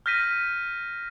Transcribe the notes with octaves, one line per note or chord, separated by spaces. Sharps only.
F6 G6 A#6 B6 D#7